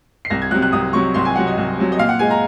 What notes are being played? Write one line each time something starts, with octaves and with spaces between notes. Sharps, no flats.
C7
C2 A#6
G#6
C3 F#3 F#6
F#6
C2 D#6
C3 F#3 C#6
C2 C6
G#5
C3 F#3 F#5
D#5
C2
C3 F#3
D#5
A#2 F5
F#5
G#3 G#5
A#5